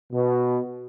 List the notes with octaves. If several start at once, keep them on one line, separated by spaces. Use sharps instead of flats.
B2